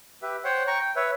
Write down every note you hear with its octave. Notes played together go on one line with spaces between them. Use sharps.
G4 B4 E5
C5 C#5 F#5 G5
G5 A#5 C#6
G5
B4 C#5 E5